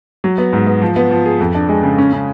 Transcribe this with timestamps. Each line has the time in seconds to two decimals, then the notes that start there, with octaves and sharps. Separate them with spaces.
0.24 F#3
0.38 B3
0.53 G#2
0.67 B3
0.82 F3
0.96 B3
1.11 F3
1.26 G#4
1.40 F2
1.55 D4
1.69 G#3
1.83 C#3
1.98 C#4
2.13 C#3